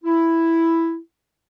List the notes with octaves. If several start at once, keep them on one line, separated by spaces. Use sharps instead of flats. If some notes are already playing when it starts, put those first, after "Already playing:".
E4